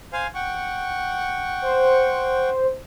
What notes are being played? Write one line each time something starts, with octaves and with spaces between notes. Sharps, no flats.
C5 F5 G#5
F#5 G5 C#6
C5